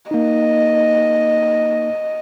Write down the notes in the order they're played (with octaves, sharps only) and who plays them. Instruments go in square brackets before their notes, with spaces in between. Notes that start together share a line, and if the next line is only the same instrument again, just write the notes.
[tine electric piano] A#3 D#4 [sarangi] D#5